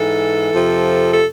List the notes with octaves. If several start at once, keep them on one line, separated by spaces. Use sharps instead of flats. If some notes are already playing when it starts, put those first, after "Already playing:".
Already playing: G#2 E3 A4
F2 C3 F3
A4